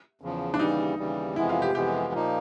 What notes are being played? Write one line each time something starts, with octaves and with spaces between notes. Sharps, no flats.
E2 C#3 F3
D4
D#2 C#3 E3 G3 D#4
D#2 C#3 E3 G3
F2 C3 E3 G#3 B3 E4
F4
G4
F2 C3 E3 G#3 B3 G4
A#2 F3 A#3 D#4